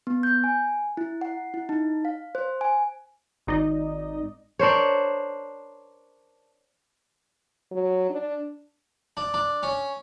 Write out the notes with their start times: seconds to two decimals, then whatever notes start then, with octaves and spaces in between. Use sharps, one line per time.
0.07 B3
0.23 G6
0.44 G#5
0.97 E4
1.21 F#5
1.54 E4
1.69 D#4
2.05 F5
2.35 C5
2.61 G#5
3.47 G#1 D#4 D5 D#5
4.59 D4 A#4 C5 C#5
7.72 F#3
8.10 D4
9.17 D4
9.34 D4
9.63 C#4